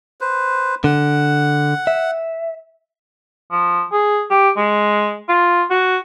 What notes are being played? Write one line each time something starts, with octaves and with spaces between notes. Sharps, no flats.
B4 C5
D3 F#5
E5
F3
G#4
G4
G#3
F4
F#4